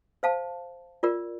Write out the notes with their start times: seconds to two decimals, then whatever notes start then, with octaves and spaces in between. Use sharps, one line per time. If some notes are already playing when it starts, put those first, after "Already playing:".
0.23 C5 F5 A5
1.03 F4 A#4 D5